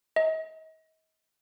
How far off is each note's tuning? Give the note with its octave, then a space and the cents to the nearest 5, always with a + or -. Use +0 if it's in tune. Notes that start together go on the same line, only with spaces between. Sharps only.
D#5 +40